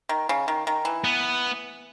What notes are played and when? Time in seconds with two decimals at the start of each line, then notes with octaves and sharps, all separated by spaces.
0.09 D#3
0.29 C#3
0.48 D#3
0.67 D#3
0.85 E3
1.04 B3